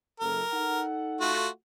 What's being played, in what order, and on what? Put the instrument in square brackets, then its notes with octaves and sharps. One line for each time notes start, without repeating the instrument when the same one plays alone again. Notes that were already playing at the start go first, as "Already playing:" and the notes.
[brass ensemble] F#1 A4 [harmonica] A#4
[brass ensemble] D#4 A4 F#5
[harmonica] A3 F4 F#4